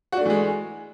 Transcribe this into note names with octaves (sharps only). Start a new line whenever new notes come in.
E3 G#3 A3 D4 F#4